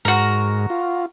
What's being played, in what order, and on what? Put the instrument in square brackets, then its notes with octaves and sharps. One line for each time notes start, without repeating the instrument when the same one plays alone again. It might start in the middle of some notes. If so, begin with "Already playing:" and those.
[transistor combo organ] G#2 [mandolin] F#4 A#4
[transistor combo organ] F4